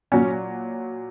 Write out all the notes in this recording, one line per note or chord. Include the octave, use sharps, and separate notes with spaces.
A#2 F#3 C#4